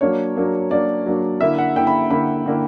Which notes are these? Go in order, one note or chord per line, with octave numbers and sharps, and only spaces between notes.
F#3 A#3 D4 C#5
F#3 A#3 D4
F#3 A#3 D4 D5
F#3 A#3 D4
D3 A#3 E4 E5
F#5
D3 A#3 E4 G5
B5
D3 A#3 E4 B5
D3 A#3 E4